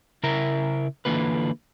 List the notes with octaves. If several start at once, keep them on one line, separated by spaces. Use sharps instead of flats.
C#3 E4 A#4 E5 A#5
D3 E3 A#3 F4 B4